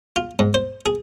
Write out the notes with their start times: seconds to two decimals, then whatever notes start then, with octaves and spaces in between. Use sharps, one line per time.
0.16 F4
0.39 G#2
0.54 C5
0.86 G#4